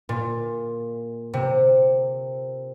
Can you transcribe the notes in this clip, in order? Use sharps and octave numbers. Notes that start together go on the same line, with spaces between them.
A#2
C3